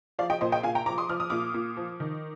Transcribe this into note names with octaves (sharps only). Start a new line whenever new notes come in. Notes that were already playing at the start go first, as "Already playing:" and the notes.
F3 D5 F5
D#5 G5
A#2 C5 D#5
D#5 G5
A#2 F5 G#5
G5 A#5
F3 A#5 D6
C6 D#6
F3 F6
D#6
A#2 D6 F6
A#2
F3
D#3